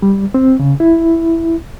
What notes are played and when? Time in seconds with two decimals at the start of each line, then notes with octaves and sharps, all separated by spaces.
0.02 G3
0.34 C4
0.60 C#3
0.80 E4